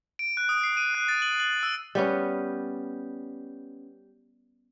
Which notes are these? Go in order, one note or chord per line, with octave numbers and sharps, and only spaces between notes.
D7
F#6
D#6
C7
D#7
F#6
A6
F#7
F#7
E6
G3 B3 C#4